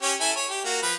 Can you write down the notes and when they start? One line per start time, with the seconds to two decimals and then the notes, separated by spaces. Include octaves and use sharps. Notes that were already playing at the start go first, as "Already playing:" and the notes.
0.02 C#4 G4 C#5
0.20 E4 A4 G#5
0.36 C#5
0.50 G4
0.65 A#3 F#4
0.83 F3 B4